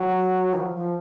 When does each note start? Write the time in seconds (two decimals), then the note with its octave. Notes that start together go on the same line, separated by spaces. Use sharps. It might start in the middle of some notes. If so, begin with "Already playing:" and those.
Already playing: F#3
0.53 D#3
0.57 F3
0.75 F3